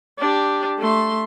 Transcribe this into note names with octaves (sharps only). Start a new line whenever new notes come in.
D4 G4
A3 C6